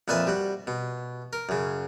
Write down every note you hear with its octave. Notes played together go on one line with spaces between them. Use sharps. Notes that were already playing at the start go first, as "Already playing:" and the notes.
F2 A#2 B4 E5 G#5 A5
G3 F#4
B2
A#4
F#2 C#3